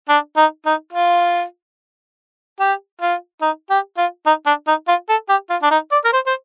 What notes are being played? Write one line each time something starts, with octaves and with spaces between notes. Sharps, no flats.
D4
D#4
D#4
F4
G4
F4
D#4
G4
F4
D#4
D4
D#4
F4
A4
G4
F4
D4
D#4
D5
A#4
C5
C5